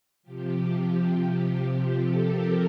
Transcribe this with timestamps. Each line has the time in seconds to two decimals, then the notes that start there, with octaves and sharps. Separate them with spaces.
0.23 C3 F3 G4
1.92 A4
2.21 G4 A#4